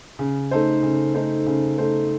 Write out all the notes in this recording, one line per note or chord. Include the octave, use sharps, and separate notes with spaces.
C#3
A3 D#4 A4 C5
C#3
A3 D#4 A4 C5
C#3
A3 D#4 A4 C5